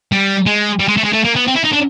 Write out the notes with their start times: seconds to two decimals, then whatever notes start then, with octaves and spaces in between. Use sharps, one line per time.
0.12 G3
0.46 G#3
0.80 G3
0.88 G#3
0.97 A3
1.04 G#3
1.13 A3
1.24 A#3
1.35 B3
1.47 C4
1.55 E4
1.64 D#4
1.73 D4